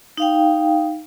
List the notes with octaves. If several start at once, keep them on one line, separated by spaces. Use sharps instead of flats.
D#4 F5 G5